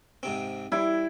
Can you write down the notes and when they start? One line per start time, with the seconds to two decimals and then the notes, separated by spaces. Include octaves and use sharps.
0.23 G#2 C3 C4
0.72 G3 E4